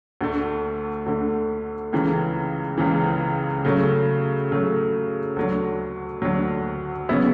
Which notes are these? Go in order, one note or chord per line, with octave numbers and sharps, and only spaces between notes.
D2 D3 A3
D2 D3 A3
C#2 C#3 E3
C#2 C#3 E3
C#3 F#3 A3
C#3 F#3 A3
D2 D3 F#3
D2 D3 F#3
C#3 F#3 B3 E4